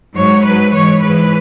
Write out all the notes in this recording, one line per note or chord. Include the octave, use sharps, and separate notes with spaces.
G#2 F#3 C#5
G#2 F#3 B4
G#2 E3 C#5
G#2 E3 B4